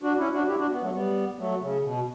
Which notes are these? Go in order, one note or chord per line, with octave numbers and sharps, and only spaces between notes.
D4 F#4
C#4 E4
D4 F#4
E4 G4
D4 F#4
B3
F#3 A3
G3 B3
F#3 A3
C#3
B2